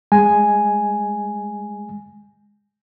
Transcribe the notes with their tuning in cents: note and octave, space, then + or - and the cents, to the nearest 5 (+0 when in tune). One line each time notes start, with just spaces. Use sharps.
G#3 -15 G#5 +0